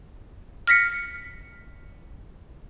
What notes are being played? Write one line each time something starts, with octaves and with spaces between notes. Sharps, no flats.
F6 A#6 B6 C#7